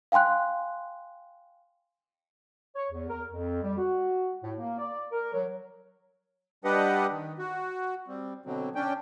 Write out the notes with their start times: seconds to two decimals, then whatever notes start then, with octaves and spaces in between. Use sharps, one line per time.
0.12 F5 G5 G#5 C6 F#6
2.76 C#5
2.91 E2
3.09 A#4
3.31 F2
3.62 G3
3.78 F#4
4.44 A2
4.58 A#3
4.79 D5
5.12 A#4
5.33 F#3
6.64 G3 D4 G4 B4 D#5 F#5
7.12 D#3
7.39 F#4
8.08 G3 C4
8.46 B2 D3 F#3 C4
8.75 C#4 D4 G5